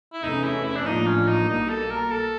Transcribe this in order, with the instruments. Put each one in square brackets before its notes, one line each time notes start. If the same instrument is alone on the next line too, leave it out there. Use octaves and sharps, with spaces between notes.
[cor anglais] E4
[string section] E2 C3 E3 A3 C#4 [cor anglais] D#4
[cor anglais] E4
E4
D4
[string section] A1 A2 F3 A#3 D4 [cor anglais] D#4
[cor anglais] C#4
D#4
[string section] B1 B2 G3 A#3 [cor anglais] D#4
[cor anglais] A4
A#4
A4